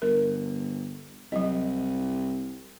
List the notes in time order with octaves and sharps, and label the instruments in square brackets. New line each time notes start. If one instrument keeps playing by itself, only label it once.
[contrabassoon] G1 [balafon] A#4
[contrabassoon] C2 [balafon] F#3 D#5